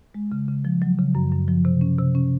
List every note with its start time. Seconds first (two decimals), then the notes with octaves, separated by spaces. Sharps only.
0.14 G#3
0.32 C#3
0.48 C#3
0.65 F3
0.82 F#3
0.98 C#3
1.15 F#2
1.32 F#2
1.48 F3
1.65 C3
1.81 C#4
1.98 C3
2.15 C#4